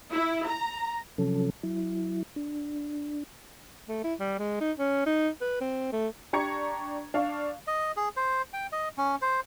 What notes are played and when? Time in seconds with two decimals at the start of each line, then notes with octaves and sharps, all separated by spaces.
0.12 E4
0.48 A#5
1.18 C3 F3 F#3 C#4 A4
1.63 F#3 E4
2.36 D4
3.88 A3
4.04 E4
4.19 G3
4.39 G#3
4.61 D#4
4.78 C#4
5.06 D#4
5.41 B4
5.61 C4
5.92 A3
6.33 D4 G4 A#5 C#6 G#6 C#7
7.14 D4 F5 C#6
7.67 D#5
7.96 G#4
8.16 C5
8.53 G5
8.72 D#5
8.97 C#4
9.22 C5